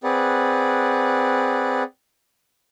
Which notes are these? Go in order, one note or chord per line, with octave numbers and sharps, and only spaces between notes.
C4 G#4 B4 D5 F#5